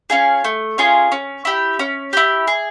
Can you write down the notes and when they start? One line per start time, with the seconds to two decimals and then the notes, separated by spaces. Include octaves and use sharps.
0.10 C#4 F4 G#4
0.44 A3
0.78 C#4 F4 G#4
1.12 C#4
1.45 E4 G4
1.79 C#4
2.13 E4 G4
2.47 G#4